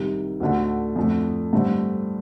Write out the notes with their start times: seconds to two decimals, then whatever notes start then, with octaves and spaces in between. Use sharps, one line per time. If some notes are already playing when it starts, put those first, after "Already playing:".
Already playing: C2 C3 D#3
0.40 D2 D3 A3
0.96 F2 D3 A3
1.53 G2 D3 A3 C4